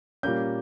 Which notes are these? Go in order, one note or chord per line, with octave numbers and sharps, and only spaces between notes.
A#2 G3 A#3 C#4 G6